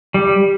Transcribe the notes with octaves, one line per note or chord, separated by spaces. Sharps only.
G3